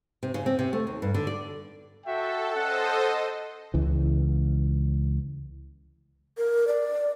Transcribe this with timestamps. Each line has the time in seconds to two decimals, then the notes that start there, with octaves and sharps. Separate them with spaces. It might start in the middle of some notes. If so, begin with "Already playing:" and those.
0.23 C3
0.34 C#3
0.46 C4
0.59 C3
0.73 A3
0.87 D#2
1.02 G2
1.14 D3
1.27 D5
2.05 F#4 A4 E5 G5
2.55 C#4 A4 C5 D#5 F#5
3.74 C#2 E3
6.38 A#4
6.68 D5